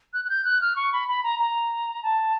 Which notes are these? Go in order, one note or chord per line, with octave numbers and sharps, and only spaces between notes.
F#6
F#6
G6
F#6
F6
C#6
B5
B5
A#5
A#5
A5